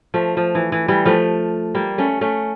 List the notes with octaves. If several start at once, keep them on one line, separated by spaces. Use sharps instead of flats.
F3 A3
F3
E3
E3
E3 G3
F3 A3
G3 A#3
A3 C#4
A3 C#4